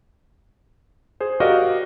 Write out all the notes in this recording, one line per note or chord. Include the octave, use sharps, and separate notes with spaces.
G#4 C5
F#4 G4 A#4 D5 D#5 F5